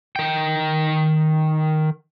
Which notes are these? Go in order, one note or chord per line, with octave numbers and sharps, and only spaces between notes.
D#3 G5